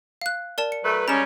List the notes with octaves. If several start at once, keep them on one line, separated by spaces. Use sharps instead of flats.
F5 F#6
A#4 D5 A5
C#7
F#3 A3 B4
G3 G#3 C#4 A#5 E7